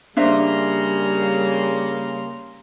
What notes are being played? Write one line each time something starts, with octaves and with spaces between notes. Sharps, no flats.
C#3 G3 A#3 D4 C5 E5 A#5 C6